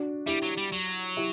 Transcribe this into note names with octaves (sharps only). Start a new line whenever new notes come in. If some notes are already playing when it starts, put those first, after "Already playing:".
Already playing: D4 F#4
G3 E4 G4
F#3
G3
F#3
E4 G4